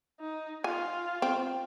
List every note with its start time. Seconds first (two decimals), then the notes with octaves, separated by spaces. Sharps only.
0.20 D#4
0.64 F4 G#5
1.22 C4